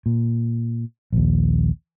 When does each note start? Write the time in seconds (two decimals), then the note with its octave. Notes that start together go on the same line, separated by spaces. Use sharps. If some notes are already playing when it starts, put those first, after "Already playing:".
0.06 A#2
1.13 A#1 D#2